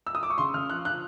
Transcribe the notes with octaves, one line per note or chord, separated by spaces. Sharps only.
E6
D#6
D6
C#6
C#3 C6
C#3 F6
F3 F#6
F3 F#6